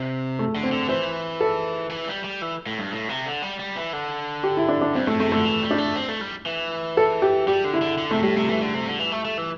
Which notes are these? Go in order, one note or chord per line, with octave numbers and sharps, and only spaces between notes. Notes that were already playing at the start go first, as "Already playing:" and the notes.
Already playing: C3
A3
D3
C4
D3
E3 C5
A4
E3
G3
G3
E3
A2
G2
A2
C3
D3
G3
G3
E3
D3
G4
E4
D4
D4
G2 C4
A2 A3
C3 A3
D3 A3
E3
G3
D4
A3
C4
A3
G3
E3
A4
G4
G3 G4
D3
E4
D3
D3
C3 A3
A2 G3
C3 A3
E3 A3
D3
C3
D3
E3
A3
A3
E3